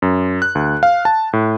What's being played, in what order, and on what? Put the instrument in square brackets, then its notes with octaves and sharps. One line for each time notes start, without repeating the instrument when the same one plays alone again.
[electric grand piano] F#2
F#6
D2
F5
A5
A2